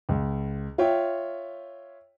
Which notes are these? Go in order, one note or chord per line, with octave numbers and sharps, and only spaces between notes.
C#2
F4 C#5 E5 G5